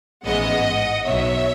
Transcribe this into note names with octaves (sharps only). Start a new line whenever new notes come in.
A1 G#2 E3 G#3 B3 D#5 F#5
B1 B2 F#3 C#5 E5